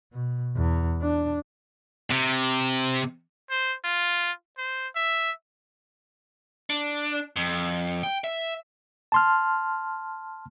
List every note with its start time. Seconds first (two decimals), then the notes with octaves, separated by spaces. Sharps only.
0.13 B2
0.56 E2
1.01 D4
2.11 C3
3.50 C5
3.85 F4
4.58 C5
4.96 E5
6.70 D4
7.36 F2
8.03 G5
8.24 E5
9.12 A5 C6 F6